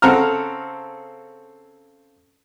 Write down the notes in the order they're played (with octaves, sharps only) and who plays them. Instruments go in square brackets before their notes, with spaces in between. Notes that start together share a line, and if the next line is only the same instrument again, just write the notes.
[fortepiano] C#3 C4 A4 F#5 A#5 F6